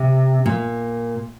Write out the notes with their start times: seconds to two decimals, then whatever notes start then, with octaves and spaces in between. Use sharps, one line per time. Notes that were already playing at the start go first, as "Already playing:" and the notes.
Already playing: C3
0.46 A#2